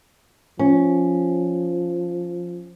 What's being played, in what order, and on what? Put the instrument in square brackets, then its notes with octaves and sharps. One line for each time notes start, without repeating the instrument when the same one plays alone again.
[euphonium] F3 [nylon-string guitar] C#4